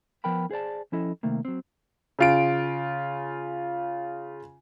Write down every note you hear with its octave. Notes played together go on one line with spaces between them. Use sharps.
F3 B3 A#4 G5 B5
G#4 C5 D5 A5
F3 C#4 E4 A4 D#5
C3 D#3 A3 A#3
F#3 C4
C#3 F4 D7